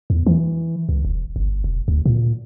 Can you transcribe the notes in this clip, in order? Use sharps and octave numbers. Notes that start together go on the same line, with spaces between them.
E2
E3
C#2
E1
G1
E1
D2
A#2